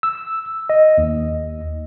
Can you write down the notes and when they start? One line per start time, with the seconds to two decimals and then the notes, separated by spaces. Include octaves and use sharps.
0.03 E6
0.70 D#5
0.98 D#2